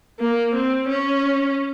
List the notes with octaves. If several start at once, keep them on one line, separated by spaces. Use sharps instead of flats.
A#3
C4
C#4